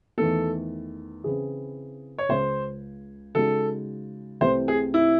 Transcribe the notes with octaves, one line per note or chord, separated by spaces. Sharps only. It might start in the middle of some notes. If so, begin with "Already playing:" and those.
E2 D#3 A3 A4
C#3 E3 C4 E4 G#4
C#5
C#2 C#3 G#3 C5
C#3 G#3 D#4 F#4 A4
C2 C3 E3 A3 C4 C5
G#4
E4